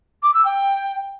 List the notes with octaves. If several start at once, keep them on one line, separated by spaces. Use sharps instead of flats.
D6
E6
G5